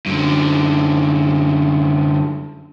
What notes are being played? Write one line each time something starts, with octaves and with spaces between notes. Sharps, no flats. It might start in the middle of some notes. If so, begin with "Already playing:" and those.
F#2 D3